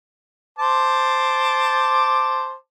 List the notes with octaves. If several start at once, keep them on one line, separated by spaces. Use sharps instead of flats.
C5 A5 D6